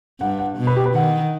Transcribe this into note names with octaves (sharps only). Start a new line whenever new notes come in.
G2 F#5
F#5
B2
B4
G4
B4
D#3 F#5